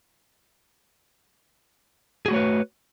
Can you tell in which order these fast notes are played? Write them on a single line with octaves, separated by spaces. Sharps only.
G#4 F#4 A3 C#5 B4